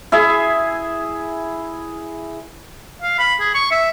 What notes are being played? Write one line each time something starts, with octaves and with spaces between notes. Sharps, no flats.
E4 G#4 E5
F5
B5
G#4
C#6
E5